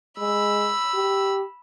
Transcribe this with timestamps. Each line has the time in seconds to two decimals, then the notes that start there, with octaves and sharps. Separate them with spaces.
0.19 G#3 B5 E6
0.94 G4